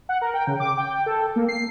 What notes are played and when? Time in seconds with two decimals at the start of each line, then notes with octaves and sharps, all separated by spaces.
0.09 F#5
0.22 A#4
0.34 G5
0.47 C#3
0.60 D6
0.77 G5
1.06 A4
1.36 A#3
1.49 C7